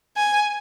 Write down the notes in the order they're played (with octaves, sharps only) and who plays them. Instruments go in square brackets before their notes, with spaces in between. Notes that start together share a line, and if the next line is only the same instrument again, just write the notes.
[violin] G#5